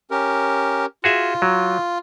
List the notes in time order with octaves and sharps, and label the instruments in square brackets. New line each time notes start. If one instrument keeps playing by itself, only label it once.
[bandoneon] C#4 G4 A#4
[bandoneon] F4 [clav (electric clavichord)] F#4 G#4 E5
[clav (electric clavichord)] F#3